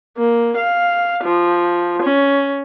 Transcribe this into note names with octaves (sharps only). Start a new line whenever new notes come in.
A#3
F5
F3
C#4